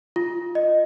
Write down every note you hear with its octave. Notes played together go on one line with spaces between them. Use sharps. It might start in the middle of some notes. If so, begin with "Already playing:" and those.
F4
D#5